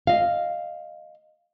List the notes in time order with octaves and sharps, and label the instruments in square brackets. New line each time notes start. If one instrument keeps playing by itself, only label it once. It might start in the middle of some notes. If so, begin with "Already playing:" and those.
[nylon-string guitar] D#5 F5